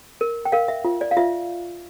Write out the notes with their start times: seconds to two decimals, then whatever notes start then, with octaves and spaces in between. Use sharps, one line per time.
0.21 A#4
0.45 G5
0.52 A#4 F5
0.68 E5
0.85 F4
1.01 D5
1.11 F5
1.17 F4 E5